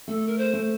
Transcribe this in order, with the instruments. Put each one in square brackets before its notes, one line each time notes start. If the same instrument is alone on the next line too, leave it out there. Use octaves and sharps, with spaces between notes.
[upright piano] A3 [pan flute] A4
[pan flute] A#4
C5
[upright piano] A3